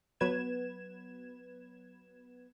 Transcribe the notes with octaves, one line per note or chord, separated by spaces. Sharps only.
F#3 B3 B4 G#6 E7